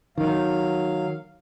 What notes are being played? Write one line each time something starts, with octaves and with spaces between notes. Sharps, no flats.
D#3 F#3 F5